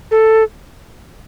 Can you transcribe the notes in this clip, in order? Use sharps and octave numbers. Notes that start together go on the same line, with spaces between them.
A4